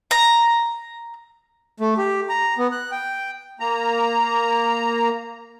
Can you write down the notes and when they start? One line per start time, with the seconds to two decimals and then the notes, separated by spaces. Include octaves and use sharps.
0.11 A#5
1.80 A3
1.97 G4
2.29 A#5
2.58 B3
2.72 F#6
2.91 G5
3.60 A#3 A#5